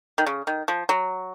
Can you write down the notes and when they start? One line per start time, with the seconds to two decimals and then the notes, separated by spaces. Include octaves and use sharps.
0.18 D#3
0.26 C#3
0.47 D#3
0.68 F3
0.89 F#3